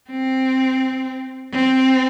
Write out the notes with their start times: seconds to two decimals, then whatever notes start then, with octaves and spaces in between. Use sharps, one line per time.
0.10 C4
1.53 C4